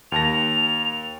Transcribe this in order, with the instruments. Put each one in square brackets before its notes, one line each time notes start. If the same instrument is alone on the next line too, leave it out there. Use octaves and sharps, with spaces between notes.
[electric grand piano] D#2 A5 A#6 [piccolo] F7